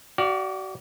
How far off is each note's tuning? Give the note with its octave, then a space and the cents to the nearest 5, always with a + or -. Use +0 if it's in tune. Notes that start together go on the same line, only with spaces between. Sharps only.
F#4 +35 D5 +0 F5 +0